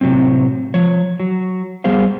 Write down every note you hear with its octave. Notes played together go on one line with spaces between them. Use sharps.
A2 C3 F#3 G#3 C4
F3 C#5
F#3
G3 B3 G#4 C5 F5